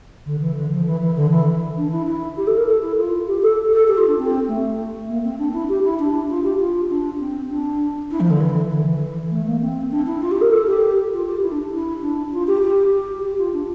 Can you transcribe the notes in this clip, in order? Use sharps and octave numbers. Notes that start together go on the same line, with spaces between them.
D3
E3
D3
F3
E3
E3
D3
E3
D4
E4
E4
G4
A4
A#4
A4
E4
F4
G4
A4
A4
G4
F4
D4
C4
A3
A#3
C4
D4
E4
G4
E4
D4
F4
G4
F4
D4
C4
D4
E4
F3
D3
E3
D3
E3
A3
A#3
C4
D4
E4
F4
G4
A#4
A4
G4
F4
G4
E4
D4
E4
D4
F4
G4
G4
G4
G4
F4
D4